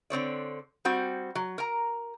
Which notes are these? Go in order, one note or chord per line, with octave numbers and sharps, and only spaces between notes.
D3 C4 C#5 D5
G3 C4 F#4
F#3
A#4 A#5